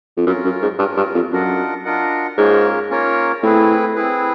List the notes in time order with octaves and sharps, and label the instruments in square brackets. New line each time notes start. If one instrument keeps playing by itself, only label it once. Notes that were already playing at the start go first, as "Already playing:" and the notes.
[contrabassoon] F2
[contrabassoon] F#2 [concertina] C#4 F4 A#4
[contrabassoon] F#2
G#2
[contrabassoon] G2 [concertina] C#4 F4 A#4
[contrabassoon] G2
F2
[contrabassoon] F#2 [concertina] D4 F4 A#4 D#5 F#5
[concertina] D4 F4 A#4 D#5 F#5
[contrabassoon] G#2 [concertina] A#3 C#4 F4 A#4 C#5
[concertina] A#3 C#4 F4 A#4 C#5
[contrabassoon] A2 [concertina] C4 E4 G#4 B4
[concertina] C4 E4 G#4 B4